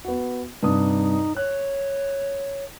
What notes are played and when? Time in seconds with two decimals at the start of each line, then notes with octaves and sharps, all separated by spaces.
0.05 B3 F#4
0.63 G2 C3 D#4 D#6
1.37 C#5 F#6